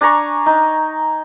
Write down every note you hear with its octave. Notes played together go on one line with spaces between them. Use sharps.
D4 G#5 A#5 C#6
D#4